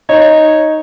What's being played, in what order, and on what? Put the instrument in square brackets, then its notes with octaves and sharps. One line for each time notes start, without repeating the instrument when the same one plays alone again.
[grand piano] D#4 [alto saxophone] C#5